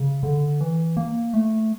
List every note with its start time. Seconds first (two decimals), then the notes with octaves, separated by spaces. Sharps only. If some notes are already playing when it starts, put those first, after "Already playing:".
Already playing: C#3
0.23 D3
0.60 E3
0.97 A#3
1.34 A3